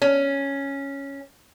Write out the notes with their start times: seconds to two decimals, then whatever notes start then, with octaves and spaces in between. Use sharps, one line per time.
0.02 C#4